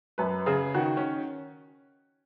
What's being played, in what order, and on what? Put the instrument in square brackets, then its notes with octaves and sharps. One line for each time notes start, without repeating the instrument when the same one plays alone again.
[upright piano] F#2 B4
C#3 G#4
D#3 F#4
C#4